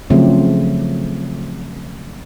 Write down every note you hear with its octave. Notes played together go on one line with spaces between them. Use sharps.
C#3 F3 F#3 A3 C4